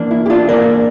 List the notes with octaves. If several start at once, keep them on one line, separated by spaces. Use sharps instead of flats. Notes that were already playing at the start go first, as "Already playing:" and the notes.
Already playing: E3 A#3 D4
E4
G4
D4 F4
E3 A#3 D4 A#4 D5